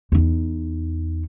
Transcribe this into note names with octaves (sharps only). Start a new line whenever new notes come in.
E2 D#4